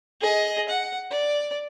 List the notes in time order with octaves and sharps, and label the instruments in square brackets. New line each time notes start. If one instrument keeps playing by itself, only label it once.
[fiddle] G#4 D#5
F#5
D5